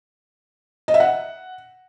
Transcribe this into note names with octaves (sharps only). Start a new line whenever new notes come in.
D#5
E5
F#5